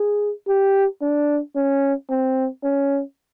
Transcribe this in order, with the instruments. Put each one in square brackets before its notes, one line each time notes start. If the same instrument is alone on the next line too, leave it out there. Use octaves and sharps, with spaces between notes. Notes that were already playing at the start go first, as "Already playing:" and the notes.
Already playing: [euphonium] G#4
G4
D4
C#4
C4
C#4